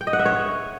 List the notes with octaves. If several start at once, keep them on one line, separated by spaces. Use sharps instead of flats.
G5
D#5
F#5
E5
C#5